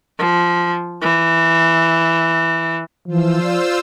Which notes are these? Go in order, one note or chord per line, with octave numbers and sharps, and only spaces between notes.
F3
E3
E3 F3 F4 C5 E6
D5